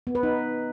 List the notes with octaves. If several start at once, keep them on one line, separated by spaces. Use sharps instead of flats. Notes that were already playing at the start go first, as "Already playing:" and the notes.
B3
B4
D#4